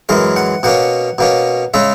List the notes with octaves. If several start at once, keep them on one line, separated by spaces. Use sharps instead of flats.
F#2 E3 G#3 A#4
F#5
B2 A#3 C#4 F#5
B2 A#3 C#4
C#3 G#3 C#4 E5